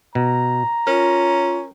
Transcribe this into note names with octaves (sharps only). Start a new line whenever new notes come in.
B2 A#5
C#4 F4 A#4